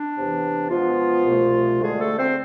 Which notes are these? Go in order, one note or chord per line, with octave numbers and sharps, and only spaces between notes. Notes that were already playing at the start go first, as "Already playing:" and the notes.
Already playing: D4
E2 C3 E3 B3
B2 F3 G#3 B3 F4
C2 B2 A3
D2 D3 G#3 A3 G#4
A3 A4
C4 C5